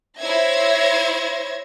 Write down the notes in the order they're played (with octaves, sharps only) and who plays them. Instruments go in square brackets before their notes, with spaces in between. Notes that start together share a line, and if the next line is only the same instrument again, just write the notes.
[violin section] E4 C5 C#5 E5 G#6 A#6